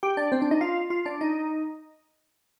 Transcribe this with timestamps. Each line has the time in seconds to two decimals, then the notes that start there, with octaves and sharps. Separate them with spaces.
0.03 G4 G5
0.17 D4 D5
0.32 C4 C5
0.41 D4 D5
0.51 D#4 D#5
0.61 F4 F5
0.90 F4 F5
1.05 D4 D5
1.21 D#4 D#5